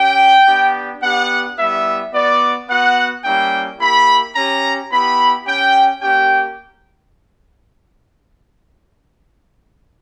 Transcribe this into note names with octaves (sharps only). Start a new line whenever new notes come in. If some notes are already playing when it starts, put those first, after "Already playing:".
Already playing: C#4 G4 G5
B3 D4 G4
B3 D4 G4 F#5
G3 B3 E4 E5
B3 F#4 D5
B3 F#4 F#5
G3 A#3 C#4 E4 G5
A#3 E4 G4 B5
C#4 G4 A#5
B3 E4 G4 B5
C#4 G4 G5
A#3 C#4 G4 G5